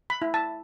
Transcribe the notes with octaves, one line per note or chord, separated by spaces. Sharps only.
B5
E4
A5